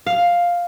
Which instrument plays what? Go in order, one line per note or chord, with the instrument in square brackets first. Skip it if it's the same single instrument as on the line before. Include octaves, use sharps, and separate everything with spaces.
[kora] F5